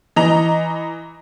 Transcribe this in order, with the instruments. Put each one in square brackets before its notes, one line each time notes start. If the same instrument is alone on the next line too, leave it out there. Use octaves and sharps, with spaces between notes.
[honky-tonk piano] E3 D#5 A#5 F7